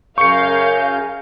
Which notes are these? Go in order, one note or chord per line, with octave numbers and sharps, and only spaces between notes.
F#2 C#3 A#4 F5 G#5 C#6 G6 C#7